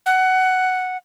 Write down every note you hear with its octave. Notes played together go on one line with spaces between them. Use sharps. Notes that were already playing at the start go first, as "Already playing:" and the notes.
F#5